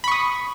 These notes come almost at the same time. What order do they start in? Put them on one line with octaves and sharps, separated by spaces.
B5 C#6 D#6